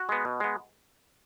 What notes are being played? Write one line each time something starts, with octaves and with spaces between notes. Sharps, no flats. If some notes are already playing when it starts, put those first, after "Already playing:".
Already playing: F#4
G#3 B3
B2
G#3 B3